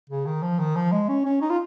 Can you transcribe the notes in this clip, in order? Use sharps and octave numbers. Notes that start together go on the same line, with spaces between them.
C#3
D#3
F3
D#3
F3
G#3
C#4
C#4
D#4
F4